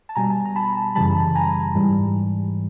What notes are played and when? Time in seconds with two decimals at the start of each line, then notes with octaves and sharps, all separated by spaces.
0.09 A5
0.15 B2 G3 G#5 A#5
0.45 A#5
0.56 A5 B5
0.95 F#2 C#3 E3 G3 A5 B5
1.35 G#5 A#5
1.75 G#2 E3 G3